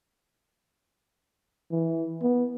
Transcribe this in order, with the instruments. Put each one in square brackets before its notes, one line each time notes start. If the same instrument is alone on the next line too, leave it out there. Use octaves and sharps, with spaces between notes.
[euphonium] E3
B3